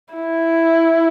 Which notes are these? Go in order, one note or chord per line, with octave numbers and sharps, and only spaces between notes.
E4